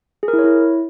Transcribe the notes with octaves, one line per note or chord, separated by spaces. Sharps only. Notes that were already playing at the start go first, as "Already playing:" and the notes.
G#4
A#4
E4
C#5
E4